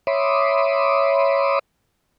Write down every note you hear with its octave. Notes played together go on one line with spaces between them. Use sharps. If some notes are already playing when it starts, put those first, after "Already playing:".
C#5 E5 B5 C6 D6 D#6